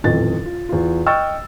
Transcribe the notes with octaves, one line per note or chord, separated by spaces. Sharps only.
D#1 A1 F2 A6
F4
E2 F4
D#5 G5 C#6 E6 F6 A6